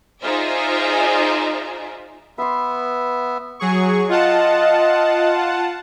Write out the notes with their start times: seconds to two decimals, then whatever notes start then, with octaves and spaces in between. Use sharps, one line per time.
0.22 D#4 F4 G#4 C5 D5 E5
2.38 B3 B4 E5 C6
3.60 F#3 G#4 C#6
4.09 F4 D#5 F#5 A5